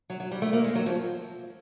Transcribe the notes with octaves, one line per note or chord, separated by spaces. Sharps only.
F#3
F#3
G3
A3
A#3
G#3
F#3
F3